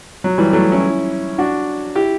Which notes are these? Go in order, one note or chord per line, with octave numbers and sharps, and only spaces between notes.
F#3
E3 G3
F#3 A3
C#4 E4
D4 F#4
E4 G4